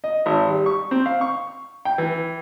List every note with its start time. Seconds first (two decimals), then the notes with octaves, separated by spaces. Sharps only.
0.04 D#5
0.26 G#1
0.48 G3
0.66 C#6
0.91 C4
1.06 F5
1.21 C#6
1.85 G5
1.98 E3